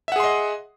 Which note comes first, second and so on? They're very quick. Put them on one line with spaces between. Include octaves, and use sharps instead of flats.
E5 F#5 G#4 C6 D#5